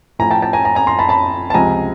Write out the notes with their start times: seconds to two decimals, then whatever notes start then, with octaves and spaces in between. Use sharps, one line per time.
0.19 A2 F3 G#5 A#5
0.31 G5 A5
0.42 G5 A5
0.53 G#5 A#5
0.65 G#5 A#5
0.75 G#5 A#5
0.87 A#5 C6
0.99 A5 B5
1.09 A5 B5
1.50 A5
1.54 C#2 C3 F3 G#5 A#5